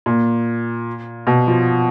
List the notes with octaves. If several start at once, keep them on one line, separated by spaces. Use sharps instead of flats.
A#2
B2
F3